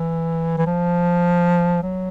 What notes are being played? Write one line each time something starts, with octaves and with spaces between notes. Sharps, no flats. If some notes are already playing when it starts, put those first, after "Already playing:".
Already playing: E3
E3
F3
F#3